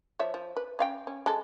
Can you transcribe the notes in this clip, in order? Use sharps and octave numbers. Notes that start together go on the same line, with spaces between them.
F3 C#5 E5
F3
B4
C#4 F5 G5
C#4
G#3 A4